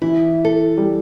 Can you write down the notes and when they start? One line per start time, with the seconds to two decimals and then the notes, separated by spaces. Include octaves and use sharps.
0.02 E3 E4
0.45 A4
0.77 G3